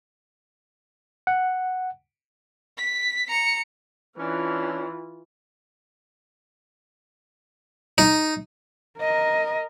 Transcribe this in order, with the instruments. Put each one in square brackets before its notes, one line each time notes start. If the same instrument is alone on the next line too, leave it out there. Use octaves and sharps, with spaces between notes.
[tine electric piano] F#5
[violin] B6
A#5 C#7
[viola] E3 F4 [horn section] C#4 D4
[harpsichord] D#4
[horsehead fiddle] A#4 D#5